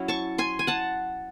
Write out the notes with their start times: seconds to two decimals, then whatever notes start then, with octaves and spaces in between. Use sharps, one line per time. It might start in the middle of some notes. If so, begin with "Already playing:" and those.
Already playing: F#3 C#4 E4
0.08 A5 C#6
0.38 G#5 C6
0.59 G#5
0.67 F#5 A5